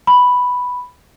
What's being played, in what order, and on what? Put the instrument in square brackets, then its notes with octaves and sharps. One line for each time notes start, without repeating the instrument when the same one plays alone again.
[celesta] B5